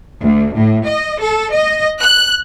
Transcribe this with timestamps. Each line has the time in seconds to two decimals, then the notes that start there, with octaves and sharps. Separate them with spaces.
0.20 D2
0.55 A2
0.86 D#5
1.22 A4
1.54 D#5
2.00 F#6